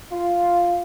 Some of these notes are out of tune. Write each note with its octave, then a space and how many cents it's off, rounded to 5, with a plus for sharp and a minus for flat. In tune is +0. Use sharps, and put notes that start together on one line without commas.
F4 +0